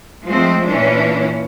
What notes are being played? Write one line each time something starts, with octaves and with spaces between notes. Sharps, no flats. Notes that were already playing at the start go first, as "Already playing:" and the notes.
F3 G#3 A3 C4
A#2 E3 C#4 D4